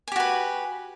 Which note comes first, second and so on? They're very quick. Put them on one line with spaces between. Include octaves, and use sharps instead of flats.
G#5 G4 F#4 B4